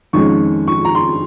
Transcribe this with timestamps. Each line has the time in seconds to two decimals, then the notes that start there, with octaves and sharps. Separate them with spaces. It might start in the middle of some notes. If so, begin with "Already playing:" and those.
0.13 F2 D#3 G#3 C#4 C#6
0.67 C#6
0.85 A#5
0.95 C6